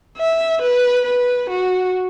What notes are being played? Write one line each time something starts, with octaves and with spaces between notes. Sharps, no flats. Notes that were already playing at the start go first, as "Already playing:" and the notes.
E5
B4
B4
F#4